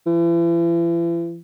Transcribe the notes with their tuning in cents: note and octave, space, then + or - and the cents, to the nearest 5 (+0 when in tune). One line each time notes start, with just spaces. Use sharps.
E3 +40